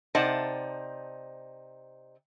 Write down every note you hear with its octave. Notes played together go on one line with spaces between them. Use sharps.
C3 D#4 C5 D5 F#5 A5